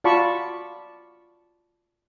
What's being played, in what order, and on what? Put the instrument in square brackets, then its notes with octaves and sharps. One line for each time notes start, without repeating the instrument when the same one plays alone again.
[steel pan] F4 F#4 D5 A5 B5 C#6